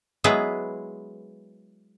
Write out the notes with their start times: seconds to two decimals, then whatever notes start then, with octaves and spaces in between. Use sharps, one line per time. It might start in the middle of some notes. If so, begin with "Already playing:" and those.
0.24 F#3 G#3 B3 E4 G#4 B4